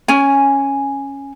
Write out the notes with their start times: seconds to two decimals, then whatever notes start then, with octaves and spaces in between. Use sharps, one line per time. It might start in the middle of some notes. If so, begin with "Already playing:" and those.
0.08 C#4 G#5